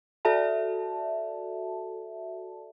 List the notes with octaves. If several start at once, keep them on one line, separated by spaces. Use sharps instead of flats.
F#4 A4 D5 E5 A5